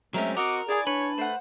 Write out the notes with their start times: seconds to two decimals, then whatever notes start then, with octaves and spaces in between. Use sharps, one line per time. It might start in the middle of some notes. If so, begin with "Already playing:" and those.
0.14 F#3 G#3 A3 C4 C#4 A#4 E5
0.37 C4 F#4 A#4 D#5 D6
0.68 E4 G#4 D5 G#5
0.87 D4 B4 C#5
1.18 A3 C5 F#5